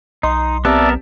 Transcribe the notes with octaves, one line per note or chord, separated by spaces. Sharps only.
B1 D#4 D#5 C6
B3 C4 G4 A#4 D5 E5 A5